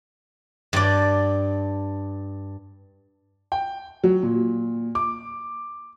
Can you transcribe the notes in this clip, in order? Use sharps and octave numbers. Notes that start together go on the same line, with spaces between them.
G2 D5
G5
F#3
A#2
D6